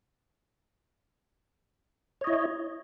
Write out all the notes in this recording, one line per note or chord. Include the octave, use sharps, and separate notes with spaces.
E4 C#5 D#5